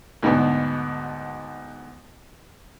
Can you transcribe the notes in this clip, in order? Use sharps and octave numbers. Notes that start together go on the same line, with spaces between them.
D2 G#2 B2 B3 D4